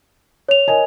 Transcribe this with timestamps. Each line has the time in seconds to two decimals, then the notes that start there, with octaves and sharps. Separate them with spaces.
0.49 C#5 F7
0.68 A#4 D#5 G#5